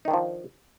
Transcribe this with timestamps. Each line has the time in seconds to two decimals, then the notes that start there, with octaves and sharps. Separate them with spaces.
0.05 D#4
0.08 D#3
0.11 D4
0.13 F3